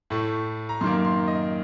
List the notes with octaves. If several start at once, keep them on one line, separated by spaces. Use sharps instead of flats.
A2 A3
A#5
F#2 D#3 A#3 C6
C6
D#5